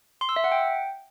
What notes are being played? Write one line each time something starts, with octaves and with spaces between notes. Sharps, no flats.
C6
E6
E5
F#5
G5